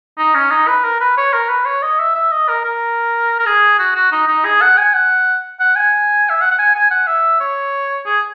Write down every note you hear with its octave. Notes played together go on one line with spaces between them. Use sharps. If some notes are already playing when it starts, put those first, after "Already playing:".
D#4
C#4
D#4
B4
A#4
B4
C#5
A#4
B4
C#5
D#5
E5
E5
D#5
A#4
A#4
A#4
G#4
F#4
F#4
D#4
D#4
G#4
F#5
G#5
F#5
F#5
G#5
E5
F#5
F#5
G#5
G#5
F#5
E5
C#5
G#4